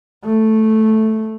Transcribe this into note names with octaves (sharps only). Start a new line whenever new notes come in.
A3